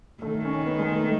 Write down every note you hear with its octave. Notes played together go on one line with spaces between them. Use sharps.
D#3 A3
C#4
B3
G#3
A3
A3